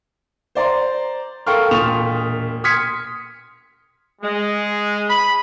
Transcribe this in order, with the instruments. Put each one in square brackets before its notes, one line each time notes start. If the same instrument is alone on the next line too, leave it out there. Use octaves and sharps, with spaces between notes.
[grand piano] C5 D5 A#5 C6
A4 A#4 F5 G5 C#6 F6
E1 A#2 C#6 D#6 F7
C6 D#6 F6 G#6 B6 C#7
[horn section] G#3
B5